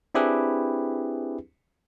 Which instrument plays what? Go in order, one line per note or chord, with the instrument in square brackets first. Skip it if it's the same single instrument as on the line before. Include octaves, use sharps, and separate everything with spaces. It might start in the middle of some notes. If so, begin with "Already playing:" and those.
[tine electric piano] C4 D4 E4 G4 G#4 B4